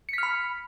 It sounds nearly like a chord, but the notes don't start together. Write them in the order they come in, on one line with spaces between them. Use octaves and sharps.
C#7 B6 F6 B5